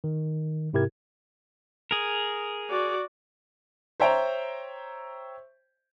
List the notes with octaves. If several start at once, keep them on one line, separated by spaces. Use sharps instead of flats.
D#3
G#2 C3 E4 G4 A#4 G#6
G#4 A#4
F#4 D5
C5 C#5 E5 G5 A#5